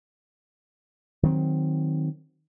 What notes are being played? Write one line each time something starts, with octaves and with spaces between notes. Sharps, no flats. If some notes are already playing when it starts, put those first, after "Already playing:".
D#3 F#3 C4